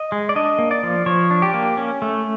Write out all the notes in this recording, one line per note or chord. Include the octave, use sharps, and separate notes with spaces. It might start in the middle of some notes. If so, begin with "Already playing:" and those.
Already playing: D#5
G#3
D5
D4 D#5
A#3
D5
F3
F3 C#5
D4
G4
A#3
C#4
A3